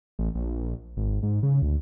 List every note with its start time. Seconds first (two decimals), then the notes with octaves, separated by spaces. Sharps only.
0.19 A1
0.35 A#1
0.97 G#1
1.23 G#2
1.43 C#3
1.62 D2